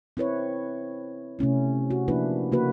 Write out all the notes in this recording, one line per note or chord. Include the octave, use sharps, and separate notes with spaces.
C4 E4 B4 C#5
C3 A3 C#4 E4
F#4
F3 A#3 D4 E4 B4
C#3 A#3 F#4 B4